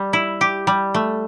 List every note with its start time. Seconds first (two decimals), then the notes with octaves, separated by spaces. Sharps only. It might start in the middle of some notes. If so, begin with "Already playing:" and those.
Already playing: G3
0.13 E4
0.41 G4
0.67 G3
0.94 A3